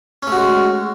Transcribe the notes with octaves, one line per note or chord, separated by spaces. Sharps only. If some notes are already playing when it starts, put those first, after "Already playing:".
G#3 A3 C#4 F#4